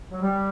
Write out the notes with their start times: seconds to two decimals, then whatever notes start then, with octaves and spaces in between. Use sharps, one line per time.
0.11 F#3
0.22 G3